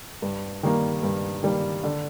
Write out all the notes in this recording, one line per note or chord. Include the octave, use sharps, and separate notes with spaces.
G2
D#3 G3 A#3
G2
D#3 G3 A#3
D3